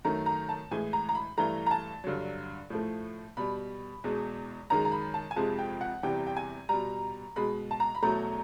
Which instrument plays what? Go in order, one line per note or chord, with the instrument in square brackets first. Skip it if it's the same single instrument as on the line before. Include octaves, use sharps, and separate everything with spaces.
[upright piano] F#2 D#3 F#3 A3 A#5
A#5
A5
A2 E3 G#3 G#5
A#5
A#5
B5
G2 E3 A3 A#5
A#5
A5
G2 D3 F#3
A2 F3 A3
B2 G3 B5
E2 B2 G#3
F#2 D#3 G#3 A#5
A#5
B5
A5
G#5
F2 C3 F3 G#3 A5
G5
F#5
E2 C3 E3 G3 G5
G5
G#5
B2 G3 A#5
B2 G#3 B5
A5
A#5
B5
E2 B2 F#3 A3 A#5